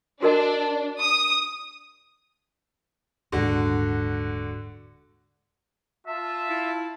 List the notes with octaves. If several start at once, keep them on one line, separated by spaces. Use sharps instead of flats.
D4 F#4 A#4 D#5
D#6
D#1 G#2 D3 F#4
F4 E5 A5
E4